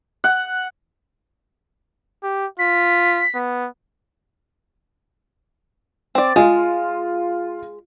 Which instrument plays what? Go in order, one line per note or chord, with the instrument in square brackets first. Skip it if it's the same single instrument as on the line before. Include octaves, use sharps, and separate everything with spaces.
[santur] F#5
[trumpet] G4
[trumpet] F4 [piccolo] B6
[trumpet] B3
[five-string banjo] C4 D5
[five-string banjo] G#3 [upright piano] F4